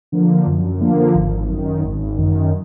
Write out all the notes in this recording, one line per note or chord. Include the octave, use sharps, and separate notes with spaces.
D3 F3 A#3
F#2
D3 F3 A#3
G#1
F#2 D#3
G#1
F#2 D#3